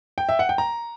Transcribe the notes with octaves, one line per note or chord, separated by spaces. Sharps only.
G5
E5
F#5
G5
A#5